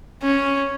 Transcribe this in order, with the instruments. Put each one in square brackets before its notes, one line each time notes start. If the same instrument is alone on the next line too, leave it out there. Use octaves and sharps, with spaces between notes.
[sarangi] C#4